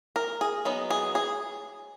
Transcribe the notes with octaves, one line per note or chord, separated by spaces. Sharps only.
A#4
G#4
F#3 B3 D#4
G#4
G#4